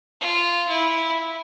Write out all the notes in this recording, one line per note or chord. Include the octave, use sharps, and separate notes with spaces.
F4
E4